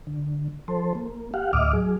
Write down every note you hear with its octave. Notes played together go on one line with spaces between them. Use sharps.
D3
F3 A4 C5
A#3
G4 F5 F#5
D2 A2 D#5 E5 D6 F6
F#3 G#4